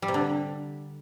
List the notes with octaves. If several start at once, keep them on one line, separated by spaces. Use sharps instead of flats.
G3
C3
D3